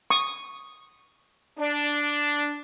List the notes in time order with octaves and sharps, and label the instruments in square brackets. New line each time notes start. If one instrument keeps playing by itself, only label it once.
[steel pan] C#6 D#6
[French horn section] D4